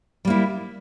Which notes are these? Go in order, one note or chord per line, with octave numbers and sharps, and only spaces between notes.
G3 A#3 E4